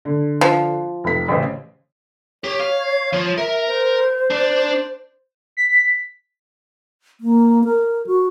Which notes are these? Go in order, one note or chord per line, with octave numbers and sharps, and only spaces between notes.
D3
F3
F1 B6
A1 C#3 C5
G4 C#5
F5
F3 F4
A#4 E5
C5
D4 D5
B6
A#3
A#4
F#4